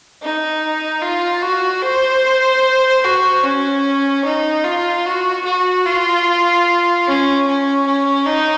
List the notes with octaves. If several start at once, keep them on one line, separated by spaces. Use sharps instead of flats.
D#4
F4
F#4
C5
F#4
C#4
D#4
F4
F#4
F#4
F4
C#4
C#4
C#4
D#4